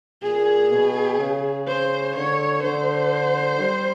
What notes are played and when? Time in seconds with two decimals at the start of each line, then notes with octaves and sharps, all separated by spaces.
0.23 A#2 G#4
0.71 B2
1.18 C#3
1.68 C5
2.16 D3 C#5
2.63 D3 C5
3.60 G3